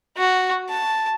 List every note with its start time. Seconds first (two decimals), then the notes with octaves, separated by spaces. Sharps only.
0.17 F#4
0.69 A5